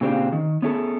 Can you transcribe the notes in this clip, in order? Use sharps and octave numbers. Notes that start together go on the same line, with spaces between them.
A#2 C#3 C4 D4 G4 F5
D#3
B3 C#4 E4 G#4 A4